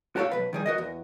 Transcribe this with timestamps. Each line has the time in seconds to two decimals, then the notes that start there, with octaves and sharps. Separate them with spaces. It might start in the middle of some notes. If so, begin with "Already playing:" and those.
0.16 F#4 G4 A4 C#5 F5
0.31 B1 C3 B4
0.53 D#3 G3 G#4
0.66 F#4 A#4 D#5
0.78 E2